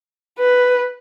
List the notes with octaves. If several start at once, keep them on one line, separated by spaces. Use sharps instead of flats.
B4